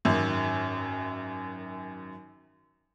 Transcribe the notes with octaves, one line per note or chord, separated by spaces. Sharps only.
G#1 F#2